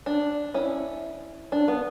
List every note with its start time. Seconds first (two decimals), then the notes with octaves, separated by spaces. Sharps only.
0.06 D4
0.54 C#4 E4
1.52 D4
1.68 B3